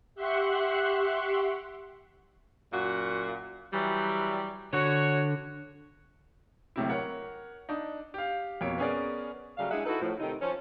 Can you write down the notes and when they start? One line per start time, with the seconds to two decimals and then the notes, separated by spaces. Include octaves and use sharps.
0.15 G4 E5 F#5 C6 C#6 F#6
2.72 F#2 A#2 F#4
3.72 E3 F#3 G3
4.73 D3 F#4 C#5
6.76 D1 A2 C3 E4
6.89 A#4 C#5 F#5
7.69 D4 D#4
8.14 G4 F5
8.61 F2 B2 A#3 C#5 D7
8.78 B3 C#4 G#4 A#4 D5
9.57 C#3 F#3 G3 A3 F5
9.71 G#3 D4 E4 G#4 E5 F#5
9.85 D#4 E4 F#4 A4 B4
10.01 A2 F3
10.20 C3 D#3 A3 C4 D#4
10.41 F3 C#4